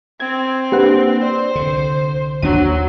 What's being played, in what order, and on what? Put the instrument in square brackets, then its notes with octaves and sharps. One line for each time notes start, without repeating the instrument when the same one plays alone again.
[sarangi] C4 [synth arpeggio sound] G#6
[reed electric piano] A#3 D4 C5 [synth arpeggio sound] G4 B4 F#5
[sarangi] C5 [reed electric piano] D5
[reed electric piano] C2 [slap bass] D3
[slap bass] D#2 D4 [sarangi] F#3 [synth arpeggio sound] D#7